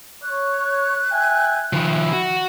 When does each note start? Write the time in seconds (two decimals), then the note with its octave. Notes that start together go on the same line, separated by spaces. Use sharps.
0.23 C#5 F#6
1.12 E5 G5 G#5
1.73 D#3 F3 E4
2.13 F#4